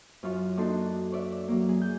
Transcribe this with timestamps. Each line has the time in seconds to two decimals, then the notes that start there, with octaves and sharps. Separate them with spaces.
0.23 F#2 F4 C#5
0.57 A#3 D4 D#4 F#4 A4 C6
1.12 C#5 D5 E5
1.48 F#3 A#3
1.69 G#4
1.81 G6